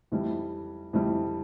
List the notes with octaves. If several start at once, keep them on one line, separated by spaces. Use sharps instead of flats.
F2 E3 G3
F2 E3 G3